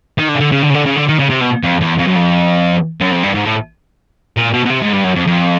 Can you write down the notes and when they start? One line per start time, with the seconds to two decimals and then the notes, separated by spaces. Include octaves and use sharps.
0.18 D#3
0.29 D3
0.35 C#3
0.40 D3
0.52 C#3
0.63 D3
0.70 C#3
0.74 D3
0.86 C#3
0.97 D3
1.09 D#3
1.20 C#3
1.30 C3
1.42 B2
1.64 F2
1.82 E2
1.99 F2
2.07 F#2
2.16 F2
3.01 F#2
3.12 F2
3.23 G2
3.35 G#2
3.46 A2
4.37 A#2
4.53 B2
4.65 B2
4.70 C3
4.82 G#2
4.93 G2
5.04 F#2
5.16 F2
5.27 F2